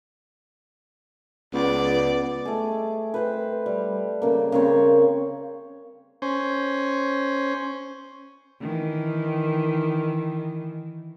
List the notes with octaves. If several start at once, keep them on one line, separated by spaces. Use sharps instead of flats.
C#2 B3 D5
A3 G#4
B4 C5 G5
G3
C#3 A#3
C#3 A#3 C4 C#5
C#4 C5
D#3 E3